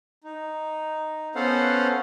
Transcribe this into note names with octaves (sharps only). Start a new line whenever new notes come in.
D#4
B3 C#4 A4 C5 F5 F#5